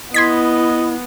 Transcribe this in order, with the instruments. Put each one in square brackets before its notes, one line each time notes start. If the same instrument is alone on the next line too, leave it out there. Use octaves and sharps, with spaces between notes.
[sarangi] B3 [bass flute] E4 [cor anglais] D#5 [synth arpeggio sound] C6 G#6 B6